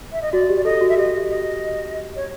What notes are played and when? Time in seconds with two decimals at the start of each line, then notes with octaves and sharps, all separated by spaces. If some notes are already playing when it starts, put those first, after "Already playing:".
0.12 E5
0.22 D#5
0.33 F#4 D5
0.49 G4
0.57 D5
0.65 A4 D#5
0.81 F#4
0.89 E5
0.97 G4 D#5
1.29 D#5
2.16 C#5